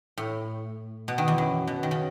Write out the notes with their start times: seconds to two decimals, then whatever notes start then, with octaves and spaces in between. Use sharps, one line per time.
0.18 A2
1.08 B2
1.18 D#3
1.28 E2
1.38 F#2
1.67 B2
1.83 D#3
1.91 C#3